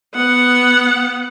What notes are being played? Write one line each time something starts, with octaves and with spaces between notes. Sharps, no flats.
B3 F#5